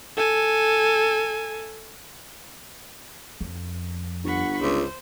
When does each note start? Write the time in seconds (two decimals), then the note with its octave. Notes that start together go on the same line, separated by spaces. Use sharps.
0.17 A4 G#5
3.41 F2
4.24 G1 F#5 B5 C#6
4.62 C#2 C5